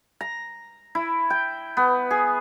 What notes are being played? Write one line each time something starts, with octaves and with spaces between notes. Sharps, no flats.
A#5
E4
G5
B3
G#4